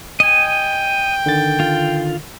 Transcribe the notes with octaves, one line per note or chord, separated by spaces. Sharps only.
D#5 G5 G#5
D3 D#3 A6
F4